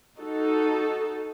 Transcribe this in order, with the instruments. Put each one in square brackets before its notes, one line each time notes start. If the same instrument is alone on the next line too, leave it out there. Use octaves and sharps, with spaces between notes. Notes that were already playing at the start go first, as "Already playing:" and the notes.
[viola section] D#4 F#4 A4